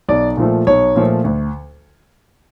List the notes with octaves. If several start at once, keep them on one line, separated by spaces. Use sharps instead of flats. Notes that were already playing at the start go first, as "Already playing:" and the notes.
B1 D5
A#2 F3 A3
B1 C#5
A#2 F3 A3
D2